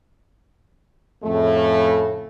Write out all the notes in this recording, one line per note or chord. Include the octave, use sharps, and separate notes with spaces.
F2 A2 C#3 A3